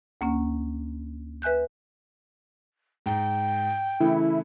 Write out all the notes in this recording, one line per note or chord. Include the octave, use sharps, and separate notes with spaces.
D2 A#3 C#4
B4 E5 G#5 F#6 G6
G#2 G5
C#3 E3 A3 E4